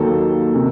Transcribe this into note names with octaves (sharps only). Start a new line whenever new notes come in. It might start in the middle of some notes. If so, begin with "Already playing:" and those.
Already playing: D#2 D#3 F#3 A4
C3 D#3